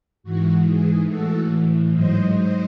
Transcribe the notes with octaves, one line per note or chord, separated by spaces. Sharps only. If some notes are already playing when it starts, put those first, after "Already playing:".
G#2 E3 F#4
G#4
A2 E3 F#4 A4
G#2 F#3 C5 D#5
C5 D#5